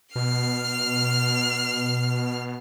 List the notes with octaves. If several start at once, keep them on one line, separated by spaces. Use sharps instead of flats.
B2 F6 C7